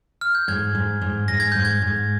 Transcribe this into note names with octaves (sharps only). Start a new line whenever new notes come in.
F6
G6
G#2 G#6
G#2
G#2
G#2 A#6
G#6
G#2 G6
G#6
G#2